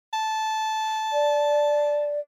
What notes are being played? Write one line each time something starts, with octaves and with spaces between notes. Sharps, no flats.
A5
D5